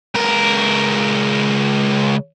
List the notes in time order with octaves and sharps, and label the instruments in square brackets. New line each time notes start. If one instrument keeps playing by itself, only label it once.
[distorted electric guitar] C#2 A#4